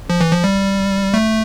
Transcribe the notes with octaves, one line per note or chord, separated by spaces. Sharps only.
F3
E3
F3
G3
A3